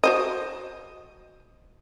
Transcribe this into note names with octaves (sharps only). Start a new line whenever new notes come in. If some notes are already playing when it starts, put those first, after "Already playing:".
F#4 C5 D#5